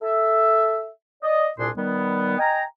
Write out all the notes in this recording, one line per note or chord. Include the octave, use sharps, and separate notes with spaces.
A4 E5
D5 D#5
C2 A#2 D4 G#4 C6
D#3 G3 B3
D#5 G5 G#5 A#5